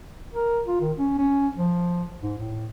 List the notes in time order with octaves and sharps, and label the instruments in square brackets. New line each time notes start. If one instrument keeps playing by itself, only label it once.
[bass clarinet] A#4
F4
D#3
C#4
C#4
F3
G#2
A2